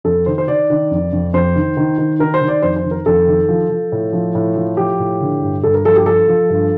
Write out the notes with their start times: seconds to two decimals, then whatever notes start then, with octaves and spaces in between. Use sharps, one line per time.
0.04 F2 A4
0.26 D#3 C5
0.38 C5
0.48 D#3 D5
0.70 D#3
0.91 F2
1.13 F2
1.33 F2 C5
1.55 D#3
1.77 D#3
1.98 D#3
2.19 D#3 A#4
2.34 C5
2.41 D#3
2.48 D5
2.62 F2 C5
2.76 C5
2.84 D#3
2.91 A#4
3.06 F2 A4
3.27 D#3
3.49 F3
3.69 F3
3.92 A2
4.13 F3
4.35 A2
4.56 F3
4.77 F3 G4
4.99 A2
5.20 D3
5.41 G2
5.63 G2 A4
5.74 A#4
5.85 F3 A4
5.96 G4
6.06 F3 A4
6.28 F3
6.50 G2